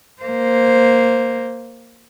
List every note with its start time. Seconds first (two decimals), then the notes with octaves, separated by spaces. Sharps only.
0.22 A#3 C5